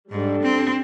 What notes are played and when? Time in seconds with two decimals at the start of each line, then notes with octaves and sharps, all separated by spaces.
0.11 G#2 G3 D4 A4
0.43 C4